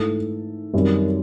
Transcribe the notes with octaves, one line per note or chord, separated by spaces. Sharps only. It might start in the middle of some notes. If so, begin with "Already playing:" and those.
Already playing: G#2 E3 A3 A4
F#2 D#3 G3 C4